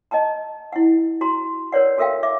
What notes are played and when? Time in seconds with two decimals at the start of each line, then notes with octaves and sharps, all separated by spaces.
0.11 D#5 G5 A5 A#5
0.73 E4 F#5
1.21 F#4 A#5 C6
1.72 A#4 B4 C#5 D5 F#5
1.98 F#4 A4 A#4 E5 F5 G5
2.23 E5 D6